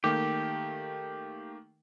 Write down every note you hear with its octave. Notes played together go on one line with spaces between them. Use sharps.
D#3 A3 A#3 G4